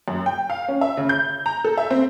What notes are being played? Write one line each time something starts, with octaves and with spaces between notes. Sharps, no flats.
F#2
G5
F5
C#4
E5
C#3
G6
A#5
A4
E5
C4